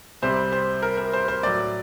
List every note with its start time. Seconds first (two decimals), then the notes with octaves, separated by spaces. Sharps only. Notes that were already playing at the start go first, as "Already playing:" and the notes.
0.22 C2 C3 G3 C5
0.52 C5
0.82 A#4
0.97 A#4
1.13 C5
1.28 C5
1.43 A2 F#3 D5